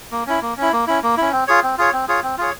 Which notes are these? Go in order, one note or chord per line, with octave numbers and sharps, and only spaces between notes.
A#3
C#4 E4
A#3
C#4 E4
A#3
C#4 E4
A#3
C#4 E4
C4
F4 G#4 C#5
C4
F4 G#4 C#5
C4
F4 G#4 C#5
C4
F4 G#4 C#5